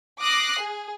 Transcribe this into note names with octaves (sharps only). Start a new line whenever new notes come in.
D6 D#6 F#6 A#6 C7
G#4